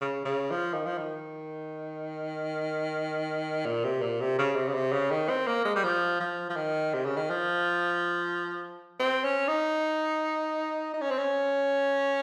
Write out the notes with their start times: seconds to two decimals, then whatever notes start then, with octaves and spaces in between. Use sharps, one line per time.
0.01 C#3
0.25 C#3
0.51 F3
0.74 D#3
0.86 F3
0.98 D#3
3.65 A#2
3.84 C3
4.01 A#2
4.21 C3
4.38 C#3
4.56 C3
4.68 C#3
4.74 C3
4.92 C#3
5.11 D#3
5.29 C4
5.47 A#3
5.65 G#3
5.76 G3
5.84 F3
6.20 F3
6.50 F3
6.56 D#3
6.94 C3
7.05 C#3
7.17 D#3
7.30 F3
8.99 C4
9.24 C#4
9.48 D#4
10.93 D#4
11.01 C#4
11.10 C4
11.18 C#4